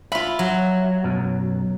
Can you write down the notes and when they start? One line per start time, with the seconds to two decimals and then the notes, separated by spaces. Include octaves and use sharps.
0.12 F4 E5 B5
0.39 F#3
1.04 B1 F#2 B2